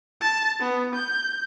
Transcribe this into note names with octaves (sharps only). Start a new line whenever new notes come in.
A5
B3
G6